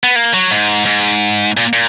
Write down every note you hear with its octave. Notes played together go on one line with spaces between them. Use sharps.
B3
A#3
F#3
G#2
G#2
A#2
A#2